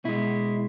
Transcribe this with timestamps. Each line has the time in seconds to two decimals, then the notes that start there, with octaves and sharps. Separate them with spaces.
0.05 B2 G#3 E4